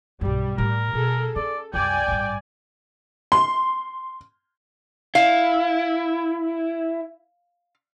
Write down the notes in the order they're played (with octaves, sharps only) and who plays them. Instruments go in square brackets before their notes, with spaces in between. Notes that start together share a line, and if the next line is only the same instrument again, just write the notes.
[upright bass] B1 G2 [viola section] G3
[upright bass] A2 E4 [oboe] A#4
[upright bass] B2 [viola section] G#4 A4
[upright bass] C#4 [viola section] A4 [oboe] D5
[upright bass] C2 F#2 [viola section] D5 G#5 [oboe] G5
[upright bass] A1 G2
[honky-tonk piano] C6
[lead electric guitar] E4 [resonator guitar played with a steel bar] F5